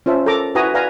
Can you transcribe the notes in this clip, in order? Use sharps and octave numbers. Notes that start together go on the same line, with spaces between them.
C#4 F4 C5 E5 A5
A4 A#4 A#5 D6
E4 F#4 B4 G#5 A#5 D#6
B4 D5 F5 G#5 A#5